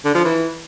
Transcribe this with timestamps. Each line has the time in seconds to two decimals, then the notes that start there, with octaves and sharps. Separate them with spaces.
0.05 D3
0.15 F3
0.25 E3